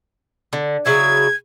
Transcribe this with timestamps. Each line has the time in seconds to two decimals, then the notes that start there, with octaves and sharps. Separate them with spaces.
0.53 D3
0.86 C#3 F#3 E4 G#6